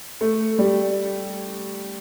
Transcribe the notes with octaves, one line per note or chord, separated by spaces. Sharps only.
A3
G3